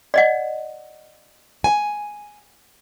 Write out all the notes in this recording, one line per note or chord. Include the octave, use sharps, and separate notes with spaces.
D5 D#5 F#5
G#5